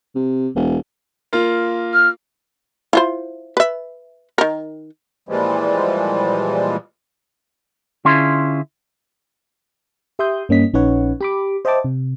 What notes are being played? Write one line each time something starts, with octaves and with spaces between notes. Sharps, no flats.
C3
E1
A#3 F4
F6
E4 F4 C5
B4 E5
D#3 A#4
A#2 E3 F3 G3 G#3
D3 C#4 E4 F4 G#4 C6
G4 E5 C6 D#6 G6
G2 A#3 C#4 D#5 B6
A#1 C#4 D#4 B4 C#5 F#5
G4 B5 D6
C5 D#5 E5 G5 A5 D6
C3